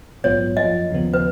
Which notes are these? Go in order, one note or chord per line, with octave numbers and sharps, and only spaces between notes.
A#1 G#2 F#3 B3 F4 C#5
F#2 F3 A#3 F4 D#5
D#2 C#3 F3 B3
B4